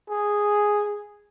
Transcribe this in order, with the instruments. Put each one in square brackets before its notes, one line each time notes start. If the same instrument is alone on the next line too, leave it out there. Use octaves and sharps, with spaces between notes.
[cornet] G#4